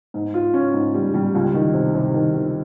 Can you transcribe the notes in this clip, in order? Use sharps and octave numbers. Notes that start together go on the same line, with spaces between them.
G#2
F4
C#4
G#2
G3
G3
C#2
D#3
C3
C3
D#3
D#3